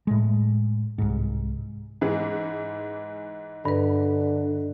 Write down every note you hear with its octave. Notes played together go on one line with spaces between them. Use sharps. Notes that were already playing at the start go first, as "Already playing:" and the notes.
A2 G#3
C2 G#2
G#2 E3 G#3
G2 D3 B4